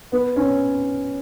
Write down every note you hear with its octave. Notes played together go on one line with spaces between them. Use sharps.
B3
C#4